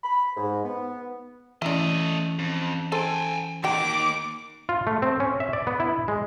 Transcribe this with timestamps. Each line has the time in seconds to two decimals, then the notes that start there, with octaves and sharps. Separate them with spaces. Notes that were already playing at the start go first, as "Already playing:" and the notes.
0.04 B5
0.36 G#2
0.64 B3
1.62 E3 A3 C#4 E4 D5 D#5
2.39 F2
2.92 A4 C5 G5 G#5
3.64 D#3 A#3 F#4 G5 D6
4.69 F4
4.87 A3
5.02 C4
5.20 C#4
5.40 E5
5.53 D5
5.67 B3
5.80 E4
6.08 G#3